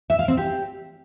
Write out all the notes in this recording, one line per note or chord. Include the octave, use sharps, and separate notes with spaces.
E5
F5
C4
G4